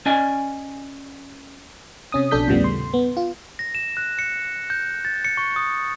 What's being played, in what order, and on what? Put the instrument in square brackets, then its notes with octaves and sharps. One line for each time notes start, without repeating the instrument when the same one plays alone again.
[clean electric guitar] C#4 D5 D#5 G#5
[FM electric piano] C3 C#4 D#6
A#1 B2 D4 A4 G6 B6
D#2 A2 C#3 F3 G3 B3
C6
B3
F4
[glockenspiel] A#6
E7
F#6
C#7
G6
A6
C#7
C#6
D#6